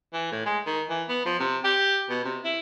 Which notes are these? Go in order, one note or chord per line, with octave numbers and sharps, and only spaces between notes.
E3
A2
G#3
D#3
E3
B3
F3
C3
G4
B2
C3
E4